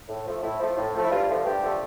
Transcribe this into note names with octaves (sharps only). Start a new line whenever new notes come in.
A2
F3 A3
A2 E4
F3 A3
A2
F3 A3
E4
G2 F4
D3 F3 A3
G2 G4
D3 F3 A3